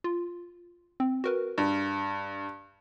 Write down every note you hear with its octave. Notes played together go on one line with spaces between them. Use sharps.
F4
C4
F#4 A#4 B4
G2